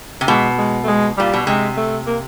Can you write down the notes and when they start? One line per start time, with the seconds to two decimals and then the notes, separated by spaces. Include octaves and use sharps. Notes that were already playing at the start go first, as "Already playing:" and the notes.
0.21 C3
0.28 B2 G#3
0.58 G#3
0.84 A3
0.87 G#3
1.17 A#2 G3
1.34 B2
1.47 C3 G#3
1.77 A3
2.07 A#3